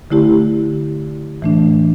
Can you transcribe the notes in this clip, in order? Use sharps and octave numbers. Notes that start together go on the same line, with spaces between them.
D3 A3 E4 G4
A2 E3 A3 D4